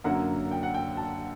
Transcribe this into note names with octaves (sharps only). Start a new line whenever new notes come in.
F#2 D3 F#3 A#3 F#5
G5
F#5
G5
A5